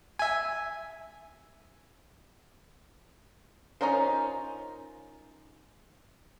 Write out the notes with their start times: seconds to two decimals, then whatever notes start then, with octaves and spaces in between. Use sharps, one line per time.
0.19 E5 G#5
3.81 C#4 D#4 F4 A#4 C5